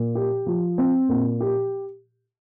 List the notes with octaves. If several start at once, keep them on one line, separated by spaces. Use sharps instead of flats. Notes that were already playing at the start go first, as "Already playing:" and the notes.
Already playing: A#2
G4
F3
C4
A#2
G4